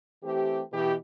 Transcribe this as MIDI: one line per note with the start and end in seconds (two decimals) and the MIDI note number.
0.24 0.63 52
0.24 0.63 57
0.24 0.63 60
0.24 0.63 67
0.73 0.94 47
0.73 0.94 52
0.73 0.94 67